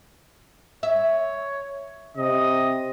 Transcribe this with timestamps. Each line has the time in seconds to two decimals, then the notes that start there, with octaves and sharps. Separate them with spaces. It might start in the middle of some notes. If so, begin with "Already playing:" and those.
0.83 C#5 E5
2.17 C3 D#5